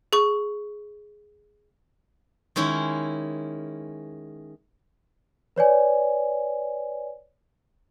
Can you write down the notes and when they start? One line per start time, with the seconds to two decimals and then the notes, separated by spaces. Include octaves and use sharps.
0.13 G#4 C#6
2.56 D#3 G#3 C#4 E4
5.56 B4 C#5 D5 G#5